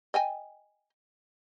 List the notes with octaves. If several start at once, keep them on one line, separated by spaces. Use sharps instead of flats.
D#5 G5 G#5